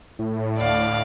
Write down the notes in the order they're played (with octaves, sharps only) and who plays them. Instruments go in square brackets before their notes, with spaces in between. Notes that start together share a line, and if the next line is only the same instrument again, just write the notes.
[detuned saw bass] A2
[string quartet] D2 D5 F5